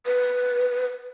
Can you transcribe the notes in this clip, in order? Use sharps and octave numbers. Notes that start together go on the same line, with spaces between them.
B4